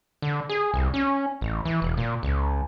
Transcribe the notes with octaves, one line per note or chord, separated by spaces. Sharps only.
D3
G#4
C2
C#4
A1
E3
E1
A#2
C#2